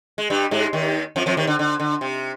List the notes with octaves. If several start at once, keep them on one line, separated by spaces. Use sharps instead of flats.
G#3
G2 G3
G#2 G#3
D#2 D#3
F2 F3
F2 F3
D#2 D#3
D3
D3
D3
C3